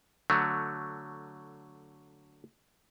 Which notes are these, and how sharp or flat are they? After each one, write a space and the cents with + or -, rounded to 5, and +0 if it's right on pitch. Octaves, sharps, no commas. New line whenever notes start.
D3 -5 F#3 +0 A3 +10